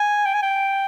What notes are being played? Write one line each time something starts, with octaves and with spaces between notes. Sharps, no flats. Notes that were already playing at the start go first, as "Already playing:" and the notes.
Already playing: G#5
G5
G#5
G5